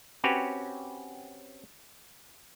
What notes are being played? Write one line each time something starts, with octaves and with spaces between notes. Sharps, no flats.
C4 C#4 F#4 G4 B4 C#5